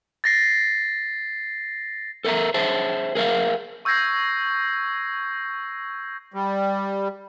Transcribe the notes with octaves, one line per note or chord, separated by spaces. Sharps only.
A6 A#6 C7
A4 A#4 E5 F5 A#5
G#4 C5 E5 A5
G#4 A#4 E5 F5
C#6 E6 G6 G#6 A#6 C7
G3